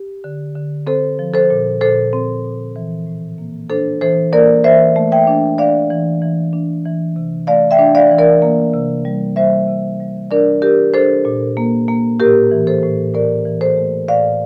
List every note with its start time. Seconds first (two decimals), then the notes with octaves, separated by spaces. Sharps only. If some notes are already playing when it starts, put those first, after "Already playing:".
Already playing: G4
0.24 D3
0.56 D3
0.87 C4 A4 C5
1.19 F3
1.34 A4 C5
1.50 A#2
1.81 A#2 A4 C5
2.13 C4
2.45 A#2
2.76 E3
3.07 A2
3.38 A#3
3.70 D4 A4 C5
4.01 E3 A4 C5
4.33 A#3 A#4 D5
4.64 E3 C5 E5
4.96 A3
5.12 E5 G5
5.27 D4
5.58 D4 D5 F5
5.90 E3
6.22 E3
6.53 D4
6.85 E3
7.16 C3
7.47 A3 D5 F5
7.71 E5 G5
7.79 D4
7.95 D5 F5
8.11 E3
8.18 A#4 D5
8.42 A#3
8.74 C3
9.05 G3
9.36 G3 C5 E5
9.68 C3
10.00 G3
10.31 D4 A#4 D5
10.62 D4 G4 A#4
10.94 D4 A4 C5
11.25 A#2
11.57 A#3
11.88 A#3
12.19 A2 G4 A#4
12.51 E3
12.67 A4 C5
12.83 A2
13.14 A2 A#4 D5
13.46 E3
13.61 A4 C5
13.77 A3
14.08 A2 D5 F5